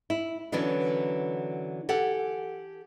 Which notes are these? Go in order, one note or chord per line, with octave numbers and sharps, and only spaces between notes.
E4
D3 E3 F#3 B3 C#4 D4
G4 A4 F#5 G#5